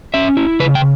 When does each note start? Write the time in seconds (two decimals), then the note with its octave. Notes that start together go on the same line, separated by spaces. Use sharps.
0.14 C#4 E5
0.37 E4
0.60 C#3 B4
0.75 G5